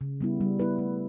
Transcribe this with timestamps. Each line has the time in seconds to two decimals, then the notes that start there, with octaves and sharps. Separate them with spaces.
0.01 C#3
0.21 G3 B3 E4
0.41 G3
0.59 B3 E4 B4
0.79 A3